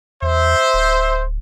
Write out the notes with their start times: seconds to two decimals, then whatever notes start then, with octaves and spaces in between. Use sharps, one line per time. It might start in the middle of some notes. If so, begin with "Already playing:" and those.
0.22 E2 C5 E5
0.74 D1